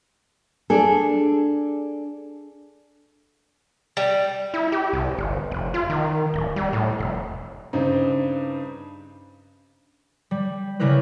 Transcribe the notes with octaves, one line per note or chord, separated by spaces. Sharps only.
D4 G#4 A4
G3
E4
G4
C2
G1
F1
F4
D#3
D1
G3
A2
F1
G2 C#3 C4 D#4
G3
C#3 G3 E4 A#4 B4